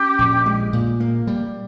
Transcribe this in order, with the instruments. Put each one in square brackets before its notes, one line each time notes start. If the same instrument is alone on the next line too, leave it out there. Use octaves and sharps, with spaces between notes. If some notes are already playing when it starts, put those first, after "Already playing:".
Already playing: [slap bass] C#4 [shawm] G4
[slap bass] A#1
G#3
A#2
A#3
G3